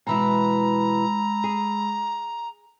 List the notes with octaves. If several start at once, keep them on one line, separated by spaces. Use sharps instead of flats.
B2 E3 G#3 E4 A#5 B5 E6
G#4